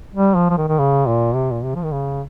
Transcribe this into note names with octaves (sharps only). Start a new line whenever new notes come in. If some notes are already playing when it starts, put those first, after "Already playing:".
G3
F3
F3
D#3
D#3
C#3
A#2
C3
A#2
C3
F3
D#3
C#3